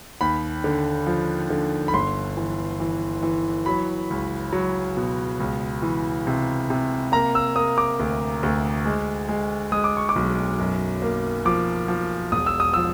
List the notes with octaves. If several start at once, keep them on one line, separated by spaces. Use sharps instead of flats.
D#2 B5
D3
F3
D3
B5
G1 C6
E3
E3
E3
F#3 B5
C#2
F#3
B2
C#2
E3
C3
C3
A#3 A#5
E6
A#3 D#6
D6
D2
D2
G#3
G#3
G#3 D#6
D6
C#6
D6
B1
F#2
A#3
F3 D6
F3
E1 D#6
E6
D#6
F3 E6